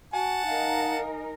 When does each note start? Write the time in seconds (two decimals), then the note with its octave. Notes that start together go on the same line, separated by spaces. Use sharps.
0.13 F#4 F#5 G#5 A5
0.45 D#4 A#4 F5